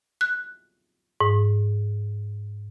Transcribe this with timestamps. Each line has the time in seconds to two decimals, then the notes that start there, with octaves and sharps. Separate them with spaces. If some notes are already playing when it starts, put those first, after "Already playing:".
0.21 F#6
1.21 G#2